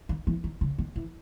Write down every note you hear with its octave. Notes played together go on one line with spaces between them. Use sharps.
D#3
E3
D#3
C#3
D#3
E3